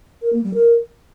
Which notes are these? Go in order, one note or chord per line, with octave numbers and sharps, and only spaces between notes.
A#4
A#3
G3
A#4